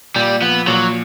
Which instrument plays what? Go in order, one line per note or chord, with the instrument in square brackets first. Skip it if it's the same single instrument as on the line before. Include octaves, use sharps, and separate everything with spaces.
[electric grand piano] A#2 [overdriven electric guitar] G3
[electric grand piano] F3 [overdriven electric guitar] B3
[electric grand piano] A#2 [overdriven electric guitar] F#3